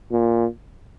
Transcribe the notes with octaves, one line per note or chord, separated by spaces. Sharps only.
A#2